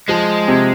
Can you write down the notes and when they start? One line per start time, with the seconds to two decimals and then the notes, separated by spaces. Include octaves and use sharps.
0.08 F3 G#3
0.48 C3